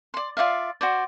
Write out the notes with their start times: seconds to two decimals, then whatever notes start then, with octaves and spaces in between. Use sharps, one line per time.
0.14 D5 C6
0.37 F4 D5 E5 F5
0.81 F#4 C5 D5